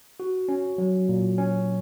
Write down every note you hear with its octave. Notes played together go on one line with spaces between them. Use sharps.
F#4
C#4
F#3
A#2
C#4